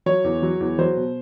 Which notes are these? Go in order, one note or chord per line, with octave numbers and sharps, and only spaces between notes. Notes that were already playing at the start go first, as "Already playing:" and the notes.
F#3 C#5
E2
F#3
E2
F#3 C5
B2